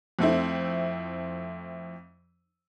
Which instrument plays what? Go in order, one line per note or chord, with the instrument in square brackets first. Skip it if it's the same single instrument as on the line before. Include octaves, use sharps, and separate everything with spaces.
[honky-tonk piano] F2 A3 C4 E4